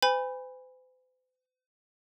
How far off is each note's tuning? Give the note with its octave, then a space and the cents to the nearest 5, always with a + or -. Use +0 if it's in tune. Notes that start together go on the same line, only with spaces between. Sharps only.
C5 -45 G#5 -30 B5 +0